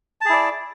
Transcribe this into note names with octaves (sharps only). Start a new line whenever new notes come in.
E4 G#4 D5 A5